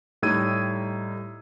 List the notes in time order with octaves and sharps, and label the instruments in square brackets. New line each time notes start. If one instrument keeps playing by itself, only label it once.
[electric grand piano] A2 G3 D#4 E6 G#6 D#7